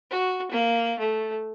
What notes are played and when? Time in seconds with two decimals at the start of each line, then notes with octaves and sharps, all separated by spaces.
0.11 F#4
0.51 A#3
0.99 A3